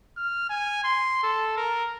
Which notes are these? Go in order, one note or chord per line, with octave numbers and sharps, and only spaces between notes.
F6
G#5
C6
A4
A#4